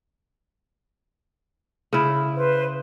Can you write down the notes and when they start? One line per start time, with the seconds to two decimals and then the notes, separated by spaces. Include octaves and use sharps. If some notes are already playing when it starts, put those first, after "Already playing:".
1.93 C#3 E4
2.35 B4 C5